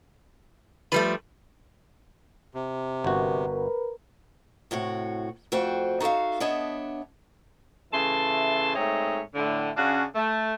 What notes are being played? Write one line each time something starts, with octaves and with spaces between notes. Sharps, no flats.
F3 G3 A3 B4
C3
G1 F#4 A#4 B4
A2 C3 F#4 C#5
F2 A3 F#4 C5 G5
D#4 F#4 A4 E5 F5
B3 D4 C#5 D#5 E5 A5
C#3 E3 A3 A5 C6
G#2 A3 C4 C#5 D#5
A2 D3
C#3 C#4 D4 F#4 F5
A3